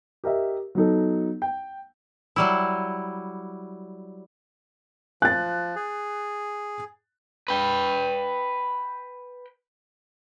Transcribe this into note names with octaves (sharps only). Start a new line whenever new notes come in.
G4 A#4 D#5 E5
F#3 B3 D#4 A4
G5
F#3 G3 E4
F3 F#6 A6
G#4
B4 G5